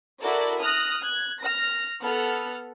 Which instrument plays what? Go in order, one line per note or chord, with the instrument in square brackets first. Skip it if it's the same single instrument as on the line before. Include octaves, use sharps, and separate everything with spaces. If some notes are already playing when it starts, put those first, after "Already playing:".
[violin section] E4 F#4 A4 A#4 D5
D#6 F6 F#6 A#6
F#6 G#6
F6 A#6
B3 A4 F#5 F6